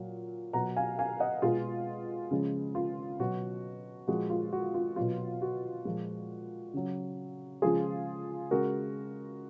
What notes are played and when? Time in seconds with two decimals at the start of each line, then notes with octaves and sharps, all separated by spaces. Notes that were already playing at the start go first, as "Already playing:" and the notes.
Already playing: A#2 F#3
0.53 B2 F#3 F#5 A#5
0.77 F5 G#5
0.99 F5 G#5
1.20 D#5 F#5
1.42 B2 G#3 F4 G#4
2.31 C#3 F3 G#3
2.75 F4
3.19 B2 F#3 F#4
4.08 A#2 F3 G#3 F#4
4.30 F4
4.53 F#4
4.74 F4
4.96 B2 F#3 F4
5.42 F#4
5.85 A#2 F3 G#3
6.74 C#3 F#3
7.62 C#3 F3 G#3 F4 G#4
8.51 C#3 G#3 F#4 A#4